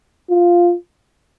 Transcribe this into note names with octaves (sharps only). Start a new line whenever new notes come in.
F4